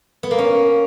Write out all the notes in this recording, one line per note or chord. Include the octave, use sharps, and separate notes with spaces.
B3
A#3
C#4